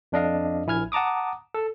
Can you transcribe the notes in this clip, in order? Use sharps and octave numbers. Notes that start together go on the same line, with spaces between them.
F2 D4 D#5 F5
A#1 E4 G#5 F6 G#6
F#5 A5 A#5 D6 D#6
A4